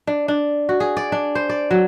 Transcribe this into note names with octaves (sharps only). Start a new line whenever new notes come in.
D4
D4
F#4
G#4
D5
D4
C5
D5
F#3